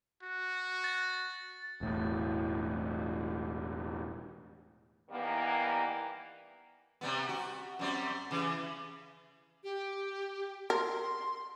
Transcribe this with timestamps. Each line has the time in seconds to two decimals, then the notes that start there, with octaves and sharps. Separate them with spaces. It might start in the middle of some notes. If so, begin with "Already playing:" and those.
0.23 F#4
0.84 A6
1.81 E1 A2
5.10 D#3 E3 G3 A#3 B3
7.01 C3 G3 B3
7.29 F#4
7.79 F#2 G3 C4
8.31 C#3 E3
9.64 G4
10.70 A#4 C6